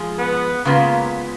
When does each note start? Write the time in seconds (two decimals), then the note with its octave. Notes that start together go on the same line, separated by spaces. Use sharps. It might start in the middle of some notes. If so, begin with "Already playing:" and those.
Already playing: F3 G#3 G#4
0.19 B3
0.65 C#3 G#3 A#3 B3 F4